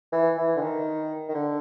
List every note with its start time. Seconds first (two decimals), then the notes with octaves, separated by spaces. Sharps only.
0.12 E3
0.38 E3
0.56 D3
0.62 D#3
1.29 D#3
1.35 D3